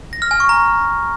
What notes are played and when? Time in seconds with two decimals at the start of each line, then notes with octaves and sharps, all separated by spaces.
0.13 A#6
0.22 F6
0.31 G#5
0.40 C#6
0.49 A#5